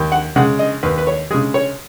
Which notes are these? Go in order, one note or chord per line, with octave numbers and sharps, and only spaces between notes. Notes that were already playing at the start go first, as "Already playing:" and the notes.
Already playing: D#2
F#5
C#3 G#3 F#5
D#5
D#2 B4
B4
C#5
C#3 G#3 G#4
C#5